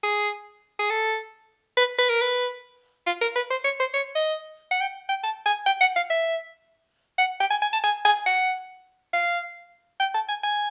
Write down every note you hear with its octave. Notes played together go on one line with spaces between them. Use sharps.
G#4
G#4
A4
B4
B4
A#4
B4
F4
A#4
B4
C5
C#5
C5
C#5
D#5
F#5
G5
G5
A5
G#5
G5
F#5
F5
E5
F#5
G5
G#5
G#5
A5
G#5
G#5
F#5
F5
G5
A5
G#5
G#5